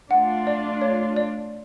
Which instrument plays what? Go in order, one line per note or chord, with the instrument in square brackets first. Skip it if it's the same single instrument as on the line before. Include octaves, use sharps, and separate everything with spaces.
[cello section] A3 D4 F4 [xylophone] F#5
[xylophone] D5
C#5
D5